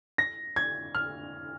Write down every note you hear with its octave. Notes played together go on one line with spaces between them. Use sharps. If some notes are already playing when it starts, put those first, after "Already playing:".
A#6
G#6
F6